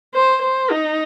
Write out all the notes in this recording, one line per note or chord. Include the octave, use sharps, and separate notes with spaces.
C5
C5
D#4